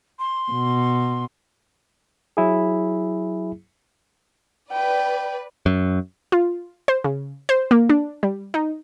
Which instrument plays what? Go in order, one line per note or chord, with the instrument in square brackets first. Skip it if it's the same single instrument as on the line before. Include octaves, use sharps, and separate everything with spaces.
[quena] C6
[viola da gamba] B2
[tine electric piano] F#3 E4 G#4
[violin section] B4 D5 [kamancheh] G5
[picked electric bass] F#2
[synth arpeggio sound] F4
C5
C#3
C5
A#3
D4
G3
D#4